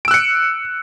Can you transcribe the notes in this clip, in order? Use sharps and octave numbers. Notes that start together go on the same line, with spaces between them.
E6 F#6 C#7 D7